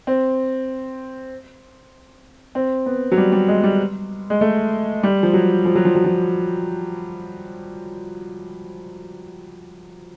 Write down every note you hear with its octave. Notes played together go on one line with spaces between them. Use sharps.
C4
C4
B3
F#3
G3
G3
G#3
G3
G#3
A3
G3
F3
F#3
F3
F#3
F3
F#3
F3